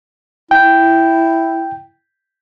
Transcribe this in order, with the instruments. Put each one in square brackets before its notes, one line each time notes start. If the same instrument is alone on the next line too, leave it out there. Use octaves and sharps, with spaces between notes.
[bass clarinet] E4 [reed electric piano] G5